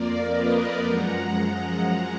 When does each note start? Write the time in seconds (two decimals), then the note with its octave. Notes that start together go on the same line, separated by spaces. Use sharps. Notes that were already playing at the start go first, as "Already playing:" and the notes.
Already playing: F2 F3 A#3 A#4 D5
0.29 B4 D#5
0.83 F#2 F3 G#3 F#5 A#5
1.36 F#5 A#5